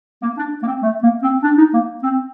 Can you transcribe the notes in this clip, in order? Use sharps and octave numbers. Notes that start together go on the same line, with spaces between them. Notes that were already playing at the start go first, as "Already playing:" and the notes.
A#3
D4
A#3
C4
A3
A#3
C4
D4
D#4
A#3
C4